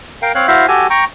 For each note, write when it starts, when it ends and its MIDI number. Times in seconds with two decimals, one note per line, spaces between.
0.22 0.32 70
0.22 0.32 77
0.22 0.32 79
0.35 0.47 60
0.35 0.47 73
0.35 0.47 77
0.35 0.47 90
0.48 0.66 64
0.48 0.66 66
0.48 0.66 72
0.48 0.66 76
0.48 0.66 77
0.68 0.87 66
0.68 0.87 67
0.68 0.87 69
0.68 0.87 80
0.90 1.05 79
0.90 1.05 82
0.90 1.05 85